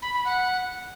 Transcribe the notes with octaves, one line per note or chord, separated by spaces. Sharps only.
B5
B5
F#5